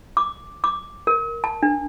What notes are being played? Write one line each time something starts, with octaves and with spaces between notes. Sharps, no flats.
D6
D6
A#4
A5
D4